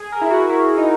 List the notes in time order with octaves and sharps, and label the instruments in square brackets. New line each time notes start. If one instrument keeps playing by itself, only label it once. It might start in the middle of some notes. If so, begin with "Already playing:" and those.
Already playing: [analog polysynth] G#4
A#4
E4
F#4
E4
D#4